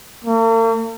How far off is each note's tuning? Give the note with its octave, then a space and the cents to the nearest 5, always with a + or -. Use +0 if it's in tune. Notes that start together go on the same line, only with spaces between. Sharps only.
A#3 -45